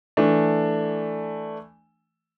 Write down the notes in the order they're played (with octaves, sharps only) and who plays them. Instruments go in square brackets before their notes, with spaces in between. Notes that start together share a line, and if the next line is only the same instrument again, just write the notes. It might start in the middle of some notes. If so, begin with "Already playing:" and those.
[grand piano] E3 A3 D4